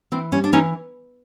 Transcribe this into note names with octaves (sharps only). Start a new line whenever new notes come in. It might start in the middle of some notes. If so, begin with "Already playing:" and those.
E3 C4
G3 C#4
D4
E3 C#4 D#4